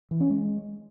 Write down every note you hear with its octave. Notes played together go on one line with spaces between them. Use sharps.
E3
C#4
G#3